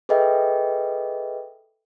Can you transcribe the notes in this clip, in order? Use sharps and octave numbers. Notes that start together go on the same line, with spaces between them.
G#4 A4 B4 D#5 E5 G5